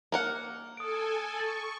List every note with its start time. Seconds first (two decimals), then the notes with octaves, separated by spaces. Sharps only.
0.12 A#3 A#4 F#5
0.77 A4 G#5 D#6 D7
1.38 C#6 A6 F#7